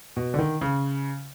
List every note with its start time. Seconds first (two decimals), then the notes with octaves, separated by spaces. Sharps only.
0.17 B2
0.34 D3
0.39 D#3
0.61 C#3